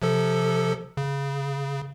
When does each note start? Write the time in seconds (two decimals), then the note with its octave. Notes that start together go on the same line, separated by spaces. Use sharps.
0.02 C3 F3 A4
0.97 C#3